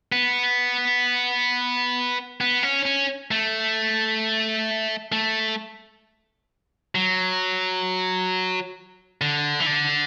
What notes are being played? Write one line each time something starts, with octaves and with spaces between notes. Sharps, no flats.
B3
B3
C#4
C#4
A3
A3
F#3
D3
E3
D3